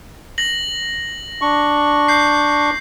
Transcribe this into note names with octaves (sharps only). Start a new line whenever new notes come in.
A#6 F#7
D4 C#6
G6 C7